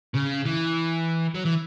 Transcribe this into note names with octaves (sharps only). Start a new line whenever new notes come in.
C#3
E3
F#3
E3